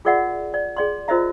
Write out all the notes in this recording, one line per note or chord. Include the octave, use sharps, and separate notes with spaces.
F4 G#4 A#4 D5 E5 F#5
D5
G#4 D5 C6
F4 A#4 C5 D#5 E5 A#5